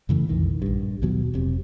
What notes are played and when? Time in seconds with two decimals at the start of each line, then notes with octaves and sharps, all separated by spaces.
0.09 F#2 C#3 E3 A3
0.29 B1 F2 D#3 E3
0.62 A#1 G2
1.02 D#2 B2 F#3
1.34 F1 C3